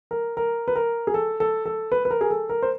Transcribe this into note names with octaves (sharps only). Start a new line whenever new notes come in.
A#4
A#4
B4
A#4
G#4
A4
A4
A4
B4
B4
A#4
G#4
A4
A#4
C5